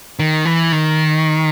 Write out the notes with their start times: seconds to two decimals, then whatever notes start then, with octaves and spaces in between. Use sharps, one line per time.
0.19 D#3
0.45 E3
0.72 D#3